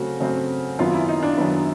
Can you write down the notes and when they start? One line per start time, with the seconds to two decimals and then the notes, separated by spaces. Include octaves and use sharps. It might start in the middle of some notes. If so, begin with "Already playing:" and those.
Already playing: C#3 F#3 A3 C4 F#4
0.20 C#3 F#3 A3 C4
0.79 F#2 D#3 F#3 B3 F4
0.94 E4
1.08 D#4
1.23 D4
1.37 F#2 D#3 F#3 B3